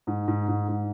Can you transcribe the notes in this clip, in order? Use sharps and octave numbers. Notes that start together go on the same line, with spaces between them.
G#2
G#2
G#2
G#2